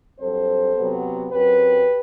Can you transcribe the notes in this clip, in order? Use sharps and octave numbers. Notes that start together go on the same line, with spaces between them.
G2 F#3 C4 A4 C5
C3 F#3 B3
F#2 F#3 C4 G4 B4